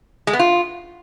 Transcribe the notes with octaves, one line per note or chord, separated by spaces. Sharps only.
G#3
B3
F4